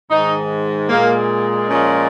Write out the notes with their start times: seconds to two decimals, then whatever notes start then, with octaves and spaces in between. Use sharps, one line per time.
0.10 G#2 D#3 G#3 D#4
0.89 A#2 G#3 A#3
1.70 A#2 F3 G#3 C#4